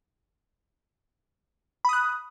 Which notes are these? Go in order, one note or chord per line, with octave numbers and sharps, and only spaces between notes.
B5 D#6 F#6